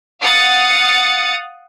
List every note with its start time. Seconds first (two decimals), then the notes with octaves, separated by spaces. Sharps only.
0.21 F5 F#5 D#6 A6 C#7